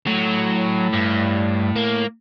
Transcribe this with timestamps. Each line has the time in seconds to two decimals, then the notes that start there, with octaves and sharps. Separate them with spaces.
0.07 A2 F#3
0.94 G2
1.76 A#3